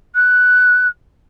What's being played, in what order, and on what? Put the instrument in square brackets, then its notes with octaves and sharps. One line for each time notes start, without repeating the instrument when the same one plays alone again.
[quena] F#6